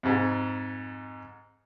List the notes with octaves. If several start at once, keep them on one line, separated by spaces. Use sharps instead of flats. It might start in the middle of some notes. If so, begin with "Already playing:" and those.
F2 G#2